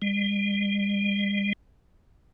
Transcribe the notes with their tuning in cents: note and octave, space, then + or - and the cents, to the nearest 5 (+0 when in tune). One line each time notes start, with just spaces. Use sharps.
G3 +45